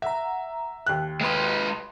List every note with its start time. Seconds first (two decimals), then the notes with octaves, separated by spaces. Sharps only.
0.02 E5 F#5 A#5
0.87 D#2 F#6
1.21 G#3 B4 D#5 C6